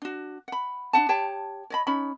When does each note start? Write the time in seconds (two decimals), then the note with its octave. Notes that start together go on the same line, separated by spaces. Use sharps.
0.02 D4 F#4
0.48 F#5 B5
0.93 D4 D#4 F#5 A5
1.09 G4 C#5 G5 A5
1.70 C#5 D#5 B5
1.87 C#4 D#4 B5